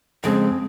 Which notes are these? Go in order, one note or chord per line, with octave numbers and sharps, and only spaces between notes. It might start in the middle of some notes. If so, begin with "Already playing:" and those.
F2 C#3 G#3 C4